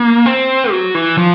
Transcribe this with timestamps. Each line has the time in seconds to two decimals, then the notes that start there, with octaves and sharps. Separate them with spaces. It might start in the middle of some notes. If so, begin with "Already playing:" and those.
Already playing: A#3
0.26 C4
0.71 F#3
0.95 E3
1.18 F3